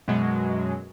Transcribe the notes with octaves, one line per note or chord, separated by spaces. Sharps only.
F#2 B2 F#3 G#3